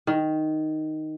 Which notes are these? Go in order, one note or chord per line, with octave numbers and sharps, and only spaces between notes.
D#3